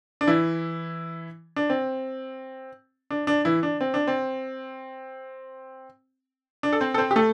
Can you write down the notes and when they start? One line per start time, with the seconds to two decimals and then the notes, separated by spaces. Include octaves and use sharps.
0.21 D4
0.27 E3 E4
1.56 D4
1.70 C4
3.11 D4
3.27 D4
3.45 E3 E4
3.63 D4
3.81 C4
3.94 D4
4.08 C4
6.63 D4
6.73 A4
6.81 C4 C5
6.94 A4
6.98 C4 C5
7.11 G4
7.16 A3 A4